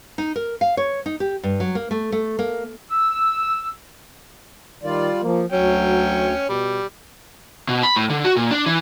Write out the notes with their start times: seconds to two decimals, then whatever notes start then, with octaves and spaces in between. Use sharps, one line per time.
0.18 D#4
0.36 A#4
0.61 F5
0.77 C#5
1.06 D#4
1.20 G4
1.43 G2
1.60 F#3
1.75 A#3
1.91 A3
2.12 A3
2.39 A#3
2.91 E6
4.83 D#3 G3 F4 D5
5.22 F3 A#3
5.52 D2 F#3 C#4 C#5 G5
6.49 B2 G3
7.69 B2
7.83 B5
7.96 A2
8.10 D3
8.25 F#4
8.37 A#2
8.51 D4
8.66 E3